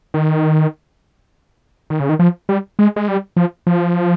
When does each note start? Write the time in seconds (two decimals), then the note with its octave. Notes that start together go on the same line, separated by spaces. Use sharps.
0.14 D#3
1.90 D#3
2.00 C#3
2.09 D#3
2.19 F3
2.49 G3
2.79 G#3
2.96 G#3
3.08 G3
3.36 F3
3.67 F3